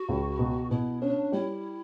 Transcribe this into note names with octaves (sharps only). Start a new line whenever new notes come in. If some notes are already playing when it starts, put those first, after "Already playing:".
Already playing: F#4
C#2
B2
B2 E4
C#4 D4
G3 E4